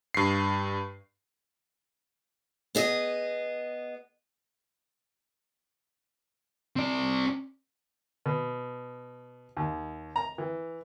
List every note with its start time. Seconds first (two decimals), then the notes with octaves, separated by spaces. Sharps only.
0.14 G2 C7
2.75 B3 G#4 D#5
6.76 C4 D5
8.26 B2
9.57 D#2
10.16 A#5
10.38 E3